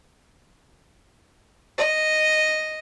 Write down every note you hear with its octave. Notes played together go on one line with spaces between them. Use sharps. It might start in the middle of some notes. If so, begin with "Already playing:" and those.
D#5